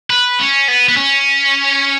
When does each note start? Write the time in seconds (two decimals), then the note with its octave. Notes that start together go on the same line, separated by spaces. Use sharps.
0.10 B4
0.39 C#4
0.68 B3
0.89 B3
0.97 C#4